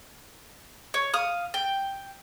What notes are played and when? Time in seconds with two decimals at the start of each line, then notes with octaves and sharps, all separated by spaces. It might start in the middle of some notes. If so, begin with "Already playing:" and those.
0.94 C#5
1.14 F5 D#6
1.54 G5